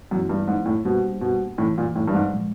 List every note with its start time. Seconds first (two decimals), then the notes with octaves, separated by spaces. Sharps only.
0.11 F#2 C3 E3 G#3 B3 E4
0.29 G2
0.48 G#2
0.66 A2
0.84 B2 G3 A#3 D4 G4 C5
1.21 B2
1.58 F2 A2 C3 E3
1.78 A#2
1.96 A2
2.08 G2
2.14 G#2
2.33 A#2 F3 G#3